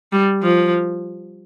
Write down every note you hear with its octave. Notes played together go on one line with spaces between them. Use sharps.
G3
F3